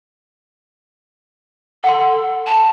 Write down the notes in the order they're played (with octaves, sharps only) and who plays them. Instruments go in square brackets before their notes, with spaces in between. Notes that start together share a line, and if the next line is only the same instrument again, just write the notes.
[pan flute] A4 [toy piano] F#5 C6
[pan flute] A5